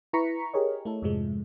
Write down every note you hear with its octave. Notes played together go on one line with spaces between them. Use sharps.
E4 B4 A#5 C#6 B6 C#7
G4 G#4 A#4 C#5 D#5
A3 E4 A4
F2 G#2 C3 F3 G#3